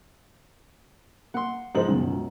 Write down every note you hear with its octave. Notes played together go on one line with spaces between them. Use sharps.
A#3 F#5 C6
G#2 F3 D#4 C5 F#7
C#2 F#2 B2 D#3